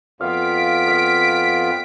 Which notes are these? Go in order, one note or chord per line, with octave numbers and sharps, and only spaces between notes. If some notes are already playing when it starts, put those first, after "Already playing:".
F2 B3 F4 F5 B6 D7
F5